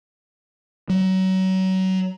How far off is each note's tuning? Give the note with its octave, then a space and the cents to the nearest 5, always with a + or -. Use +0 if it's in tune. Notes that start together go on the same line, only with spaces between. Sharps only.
F#3 +30